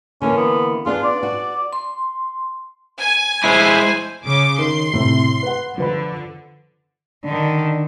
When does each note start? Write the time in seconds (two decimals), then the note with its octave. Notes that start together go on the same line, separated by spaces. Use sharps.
0.22 D3 E3 A#3 C#4
0.37 B3
0.86 B3 D4 F4 G#4
1.04 D5
1.23 F#4
1.73 C6
2.99 G#5
3.44 G#3 E4 C5
4.26 C#3 D6
4.59 D#3 C6
4.93 A2 C3
5.43 B4 F#5
5.78 D3 F3 B4 B5
7.24 D3 D#3 D4